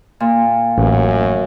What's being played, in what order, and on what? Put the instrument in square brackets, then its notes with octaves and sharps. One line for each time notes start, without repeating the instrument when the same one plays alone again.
[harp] A#2
[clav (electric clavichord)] A1 [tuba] F#2